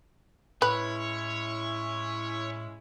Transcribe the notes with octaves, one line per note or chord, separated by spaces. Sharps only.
A2 G#3 C#4 E4 B4 C#5